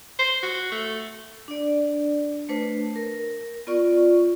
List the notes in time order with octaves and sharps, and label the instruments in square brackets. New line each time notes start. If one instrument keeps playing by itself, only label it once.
[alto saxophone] C5
F#4
A3
[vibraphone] D4 D5
A3 D4 B4 C5
A#4
B3 F4 D5 C#6